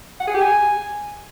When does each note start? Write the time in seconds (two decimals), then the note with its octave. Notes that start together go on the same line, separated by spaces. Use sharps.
0.20 F#5
0.27 G#4
0.34 G4
0.42 G#5